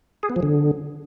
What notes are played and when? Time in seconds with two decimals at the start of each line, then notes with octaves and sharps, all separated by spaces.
0.23 G#4
0.30 B3
0.36 F3
0.43 D3